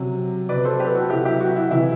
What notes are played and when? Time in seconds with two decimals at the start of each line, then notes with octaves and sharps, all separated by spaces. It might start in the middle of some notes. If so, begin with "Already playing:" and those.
Already playing: C3 F#3
0.49 C3 F#3 B4 D5
0.65 A4 C5
0.80 G4 B4
0.95 F#4 A4
1.10 C3 F#3 E4 G4
1.25 E4 G4
1.40 F#4
1.56 E4
1.71 C3 E3 E4